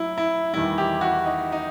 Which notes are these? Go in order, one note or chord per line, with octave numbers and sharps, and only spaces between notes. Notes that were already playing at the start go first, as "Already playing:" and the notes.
Already playing: F#3 E4
E4
E2 D#3 G3 E4
G4
F#4
D#4
D#4